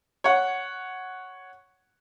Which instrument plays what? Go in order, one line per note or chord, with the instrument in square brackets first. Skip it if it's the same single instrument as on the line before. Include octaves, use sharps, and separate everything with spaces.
[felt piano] C#5 F#5